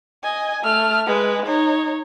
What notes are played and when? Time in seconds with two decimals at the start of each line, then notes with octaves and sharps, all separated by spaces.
0.24 D#5 G#5
0.63 A3 F6
1.07 G#3 B4
1.46 D#4 C#5